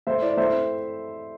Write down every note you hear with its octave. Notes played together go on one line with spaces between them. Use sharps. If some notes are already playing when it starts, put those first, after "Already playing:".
A3 C5 E5
E4 D5
A3 C5 E5
C4